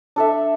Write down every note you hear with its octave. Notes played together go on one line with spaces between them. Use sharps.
D4 A4 E5